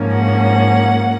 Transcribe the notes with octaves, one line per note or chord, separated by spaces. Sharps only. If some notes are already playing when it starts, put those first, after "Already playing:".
Already playing: G#2 F3 A#3 C#4
F#5